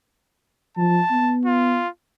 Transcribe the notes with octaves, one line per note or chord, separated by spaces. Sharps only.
F3 A5
B3
F4